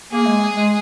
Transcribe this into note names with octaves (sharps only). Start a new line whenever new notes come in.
A#3 G#4
G#3
G#3